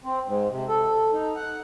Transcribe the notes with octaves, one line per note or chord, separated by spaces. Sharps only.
C4
G#2
C3
A4
D#4
F#5